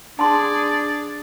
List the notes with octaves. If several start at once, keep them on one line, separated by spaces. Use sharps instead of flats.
D4 G#4 D5 A5 C6